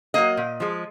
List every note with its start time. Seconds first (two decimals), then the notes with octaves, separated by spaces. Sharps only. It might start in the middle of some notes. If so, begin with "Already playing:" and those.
0.14 F#3 A#3 D#5
0.37 A#2
0.60 F3 G#3